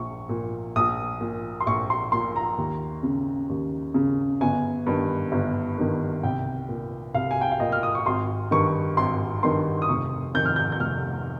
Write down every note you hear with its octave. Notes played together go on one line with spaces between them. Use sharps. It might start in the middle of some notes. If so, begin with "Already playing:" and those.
Already playing: A#1 C#6
A#2
A#1 D#6
A#2
C6
A#1 C#6
C6
A#2 C6
A#5
D#2
C#3
D#2
C#3
G1 G#5
G2 D#3
G1
G2 D#3
C2 G5
A#2
C2 F5
G#5
G5
F5
A#2 D#5
F6
D#6
C#6
G#1 C6
G2 D#3 C#6
G#1 C6
G2 D#3 C6
D#6
F1 C#6
F2 D#3 G6
F6
G6
G6
F1 F6